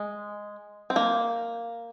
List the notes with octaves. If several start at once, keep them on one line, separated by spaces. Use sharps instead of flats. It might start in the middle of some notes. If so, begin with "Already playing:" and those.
Already playing: G#3
C4
A#3